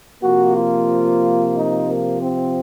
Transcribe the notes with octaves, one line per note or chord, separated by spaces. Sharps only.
C3 F3 A#3 F#4
F4
D#4
A#3
C4